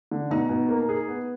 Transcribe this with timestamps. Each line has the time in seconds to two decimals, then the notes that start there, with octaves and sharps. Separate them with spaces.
0.11 D3
0.30 B2 D#4
0.49 B2
0.69 A#3
0.89 G#4
1.08 B3